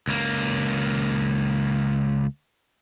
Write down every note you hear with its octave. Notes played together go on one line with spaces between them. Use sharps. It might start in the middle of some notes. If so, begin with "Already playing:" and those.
C#2 A#3